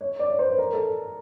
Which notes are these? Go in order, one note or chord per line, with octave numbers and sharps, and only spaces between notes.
C#5
D5
C#5
C5
B4
A#4
A4